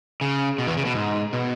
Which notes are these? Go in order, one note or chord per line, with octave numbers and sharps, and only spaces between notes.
C#3
B2
E2 E3
C#3
B2
G#2
B2